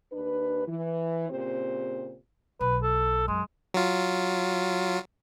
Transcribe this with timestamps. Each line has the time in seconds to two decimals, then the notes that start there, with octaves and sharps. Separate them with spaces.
0.12 D#2 D4 B4
0.67 E3
1.30 A#2 C#3 C4 G4 C5
2.61 B1 B4
2.83 A4
3.28 F#2 G#3
3.74 F#3 F4